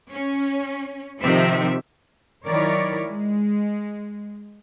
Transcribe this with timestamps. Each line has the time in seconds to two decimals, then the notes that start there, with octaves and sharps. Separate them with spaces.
0.13 C#4
1.22 C3 D#3 F3 C4 E5
2.46 D#3 F#3 E4 A#4 C#5 D5
3.03 G#3